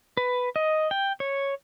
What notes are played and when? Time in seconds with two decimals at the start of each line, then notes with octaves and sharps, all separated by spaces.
0.17 B4
0.56 D#5
0.91 G5
1.20 C#5